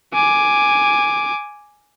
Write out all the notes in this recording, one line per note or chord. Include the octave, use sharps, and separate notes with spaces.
G#5 D6